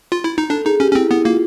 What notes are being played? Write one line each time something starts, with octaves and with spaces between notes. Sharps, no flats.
F4
E4
D#4
D4 A4
D#4 G#4
C#4 G4
C#4
C4 E4
B3 E4
A#3 F4